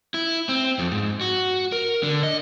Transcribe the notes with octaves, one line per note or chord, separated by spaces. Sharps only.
E4
C4
F2
G#2
F#4
A#4
D3
D#5